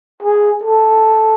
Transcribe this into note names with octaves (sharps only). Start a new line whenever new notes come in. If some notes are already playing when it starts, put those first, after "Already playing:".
G#4
A4